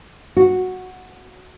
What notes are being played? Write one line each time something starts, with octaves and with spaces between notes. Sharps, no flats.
F#4